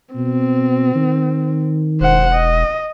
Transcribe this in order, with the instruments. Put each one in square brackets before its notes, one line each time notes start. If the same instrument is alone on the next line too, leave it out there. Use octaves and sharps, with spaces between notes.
[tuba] B2 [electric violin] C4
[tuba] D#3
[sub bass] E1 [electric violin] C5 F#5
[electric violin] D#5